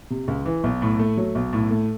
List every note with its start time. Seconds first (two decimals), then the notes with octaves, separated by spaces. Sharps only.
0.10 C3
0.28 C#2
0.45 E3
0.64 B1
0.82 A2
0.99 A3
1.17 F#3
1.35 B1
1.53 A2
1.71 A3